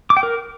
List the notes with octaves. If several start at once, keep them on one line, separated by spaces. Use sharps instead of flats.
D6
G5
A#4